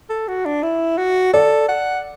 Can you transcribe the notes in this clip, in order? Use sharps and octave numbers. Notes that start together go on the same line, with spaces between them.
A4
F#4
D4
E4
F#4
A4 D5
F#5